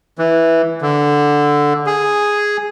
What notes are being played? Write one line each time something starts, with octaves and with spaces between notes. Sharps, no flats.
E3
D3
G#4